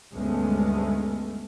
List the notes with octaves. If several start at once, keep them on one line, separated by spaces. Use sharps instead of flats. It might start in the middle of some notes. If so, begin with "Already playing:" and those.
D2 G2 G#3 A3 B3 C#4